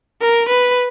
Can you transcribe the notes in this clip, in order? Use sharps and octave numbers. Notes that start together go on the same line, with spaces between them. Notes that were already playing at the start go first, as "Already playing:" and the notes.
A#4
B4